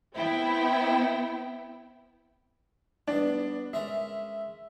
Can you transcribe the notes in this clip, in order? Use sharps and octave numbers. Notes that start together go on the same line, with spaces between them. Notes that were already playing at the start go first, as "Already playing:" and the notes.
B3 C4 E4 G5
G2 B3 D4
G#3 C#4 A#4 E5